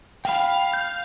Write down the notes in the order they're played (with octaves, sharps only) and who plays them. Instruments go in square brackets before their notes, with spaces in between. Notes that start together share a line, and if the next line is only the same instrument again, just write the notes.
[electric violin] F5 [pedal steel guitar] G5 B5
[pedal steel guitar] G6